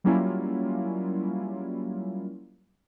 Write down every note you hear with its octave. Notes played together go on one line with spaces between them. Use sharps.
F#3 G3 A#3 C#4 E4 F4